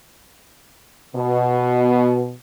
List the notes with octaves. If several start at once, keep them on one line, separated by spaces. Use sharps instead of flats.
B2